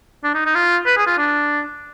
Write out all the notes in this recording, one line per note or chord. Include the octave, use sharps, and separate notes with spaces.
D4
D#4
D#4
F4
B4
G#4
F4
D4